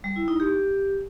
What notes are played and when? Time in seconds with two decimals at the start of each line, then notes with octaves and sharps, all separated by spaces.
0.04 G3
0.16 E4
0.28 D#4
0.40 G4